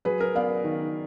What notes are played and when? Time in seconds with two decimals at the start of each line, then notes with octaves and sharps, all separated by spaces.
0.05 F#3 G#4 B4
0.20 A#4
0.35 B3 D5 F5
0.65 D#3